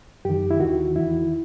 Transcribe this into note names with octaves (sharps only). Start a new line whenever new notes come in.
F#2 D#3 G4
E4
D#2 D#3 F#4
E2 D#3 E4